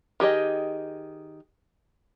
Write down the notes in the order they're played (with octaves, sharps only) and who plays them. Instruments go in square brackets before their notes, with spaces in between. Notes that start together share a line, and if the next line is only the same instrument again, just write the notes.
[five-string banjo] D#3 G4 G#4 D#5